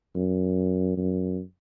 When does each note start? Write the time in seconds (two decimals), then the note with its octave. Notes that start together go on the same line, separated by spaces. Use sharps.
0.15 F#2
0.97 F#2